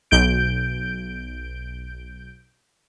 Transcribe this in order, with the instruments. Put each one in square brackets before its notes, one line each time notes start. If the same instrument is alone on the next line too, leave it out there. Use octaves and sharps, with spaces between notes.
[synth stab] B1 G6 D7